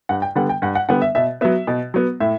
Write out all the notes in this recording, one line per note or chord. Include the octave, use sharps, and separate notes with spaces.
G2 F#5
G5
D3 G3 B3 F#5
G5
G2 F#5
F#5
D3 G3 B3 F#5
E5
B2 E5
F#3 B3 E5
B2
F#3 B3
A2 E5